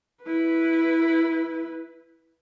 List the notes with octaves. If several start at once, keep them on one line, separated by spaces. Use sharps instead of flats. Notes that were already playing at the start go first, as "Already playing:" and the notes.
E4 B4